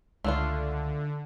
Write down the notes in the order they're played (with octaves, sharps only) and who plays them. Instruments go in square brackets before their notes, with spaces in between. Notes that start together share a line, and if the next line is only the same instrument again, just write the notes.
[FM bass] C#2 [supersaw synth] D3 [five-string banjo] A3 D4 F4